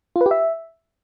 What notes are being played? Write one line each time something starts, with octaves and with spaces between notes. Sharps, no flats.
F4
B4
G4
E5